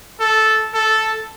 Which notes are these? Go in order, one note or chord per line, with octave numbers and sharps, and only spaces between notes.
A4
A4